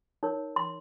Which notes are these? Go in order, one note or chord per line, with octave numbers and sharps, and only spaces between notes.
D#4 A#4 C#5
C6